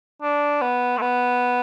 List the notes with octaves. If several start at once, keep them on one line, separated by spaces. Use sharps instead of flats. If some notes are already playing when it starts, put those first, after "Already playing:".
D4
B3
A3
B3